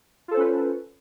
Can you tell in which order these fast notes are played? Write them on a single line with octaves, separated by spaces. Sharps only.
F4 A4 C5 C#4 B4